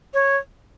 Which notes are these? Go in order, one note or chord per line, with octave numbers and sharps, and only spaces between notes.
C#5